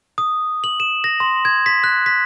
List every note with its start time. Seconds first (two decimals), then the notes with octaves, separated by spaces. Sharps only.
0.18 D#6
0.64 F#7
0.80 E7
1.04 A#6
1.20 C6
1.45 G#6
1.66 B6
1.84 F#6
2.06 B6